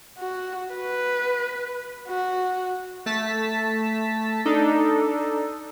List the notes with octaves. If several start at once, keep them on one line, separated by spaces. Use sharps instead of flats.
F#4
B4
F#4
A3 A5 B6
D4 D#4 A4